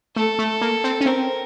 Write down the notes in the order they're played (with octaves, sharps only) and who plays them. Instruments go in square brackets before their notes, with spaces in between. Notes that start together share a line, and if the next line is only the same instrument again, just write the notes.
[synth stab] A3 [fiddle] A4
[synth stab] A3
A#3
C4
C#4
[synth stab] C4 [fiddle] A#4